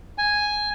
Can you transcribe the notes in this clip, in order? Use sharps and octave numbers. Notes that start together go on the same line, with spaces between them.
G#5